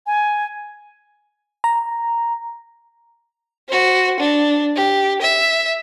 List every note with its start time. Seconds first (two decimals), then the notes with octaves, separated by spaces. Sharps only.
0.07 G#5
1.64 A#5
3.69 F#4 C5
4.19 D4
4.76 G4
5.22 E5